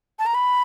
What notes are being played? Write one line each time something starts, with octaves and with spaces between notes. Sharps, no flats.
A5
A#5
B5